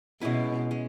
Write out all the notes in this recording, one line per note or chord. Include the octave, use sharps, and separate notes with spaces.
B2 G#3 C#4 E4 B4
G#3 C#4